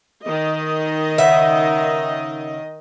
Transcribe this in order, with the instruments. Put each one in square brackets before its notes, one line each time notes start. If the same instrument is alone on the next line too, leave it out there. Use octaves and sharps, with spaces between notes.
[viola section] D#3 D#5
[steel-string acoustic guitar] C#3 E5 F#5